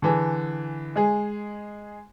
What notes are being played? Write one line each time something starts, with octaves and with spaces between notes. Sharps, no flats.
D3 E3 G#4
G#3 G#4